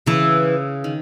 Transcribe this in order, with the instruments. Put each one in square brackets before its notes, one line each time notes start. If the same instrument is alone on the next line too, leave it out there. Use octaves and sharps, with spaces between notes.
[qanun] C#3 [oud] E3
[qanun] D#3